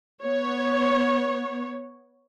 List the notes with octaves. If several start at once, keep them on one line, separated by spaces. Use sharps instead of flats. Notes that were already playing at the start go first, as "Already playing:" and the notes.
B3 C#5